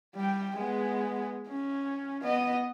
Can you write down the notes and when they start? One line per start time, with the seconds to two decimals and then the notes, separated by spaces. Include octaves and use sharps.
0.16 G3 G5
0.56 G#3 B3
1.48 C#4
2.22 B3 D#5